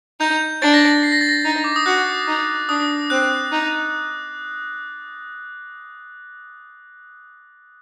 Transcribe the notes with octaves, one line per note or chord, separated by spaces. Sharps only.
D#4 G6
D4 A6
A#6
A6
C7
A#6
A6
A#6
D#4
D6
D#6
F#4 F#6
D#4
D4 D#6
C4 F#6
D#4